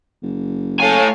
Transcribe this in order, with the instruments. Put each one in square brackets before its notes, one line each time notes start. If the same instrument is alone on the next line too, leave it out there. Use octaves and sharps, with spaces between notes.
[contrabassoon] F#1
[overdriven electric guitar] A2 G#5 [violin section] A4 C#5 F5